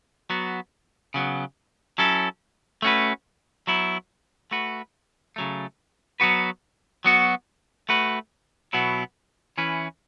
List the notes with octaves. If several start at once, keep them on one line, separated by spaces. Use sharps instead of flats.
F#3 B3 F#4
C#3 F#3 B3
F#3 C#4 E4 A4
A3 C#4 F#4 B4
F#3 B3 E4
A3 F#4 B4
C#3 F#3 A3
F#3 B3 F#4 B4
F#3 B3 F#4
A3 F#4 B4
B2 F#3 B3 E4
E3 C#4 E4 B4